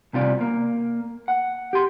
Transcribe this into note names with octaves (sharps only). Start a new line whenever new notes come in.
C2 C3 F4 D5
A#3
F#5
G4 C6